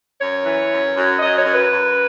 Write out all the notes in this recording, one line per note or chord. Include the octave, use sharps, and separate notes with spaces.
F#2 C#5
E3
F#2
F#2
F#2 D#5
C#5
F#2
B4
F#2